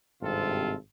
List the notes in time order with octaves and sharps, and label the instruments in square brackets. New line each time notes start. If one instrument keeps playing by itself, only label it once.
[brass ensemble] G#1 G2 C3 F4 A4